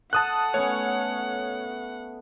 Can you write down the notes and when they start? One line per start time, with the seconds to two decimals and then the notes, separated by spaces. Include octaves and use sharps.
0.13 A4 F#5 A5 D#6 F#6
0.54 A3 B3 C#4 C#5